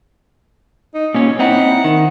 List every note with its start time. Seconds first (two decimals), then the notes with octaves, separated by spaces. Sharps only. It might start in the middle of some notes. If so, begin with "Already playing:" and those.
0.94 D#4
1.14 A#2 C#4 C#5
1.39 C4 D#4 E4 F#5
1.84 D#3